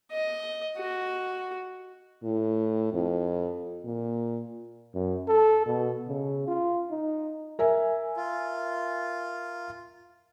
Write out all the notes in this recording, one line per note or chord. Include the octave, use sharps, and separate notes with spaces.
D#5
F#4
A2
F2
A#2
F#2
A4
B2
C#3
F4
D#4
A#4 E5 G#5
F4